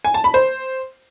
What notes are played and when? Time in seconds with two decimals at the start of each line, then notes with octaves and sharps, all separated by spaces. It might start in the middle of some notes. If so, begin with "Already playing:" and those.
0.05 G#5
0.14 A5
0.24 B5
0.34 C5